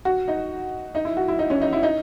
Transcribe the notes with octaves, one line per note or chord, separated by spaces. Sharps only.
F#4
D#4
D#4
E4
F#4
E4
D#4
C#4
D#4
E4
D#4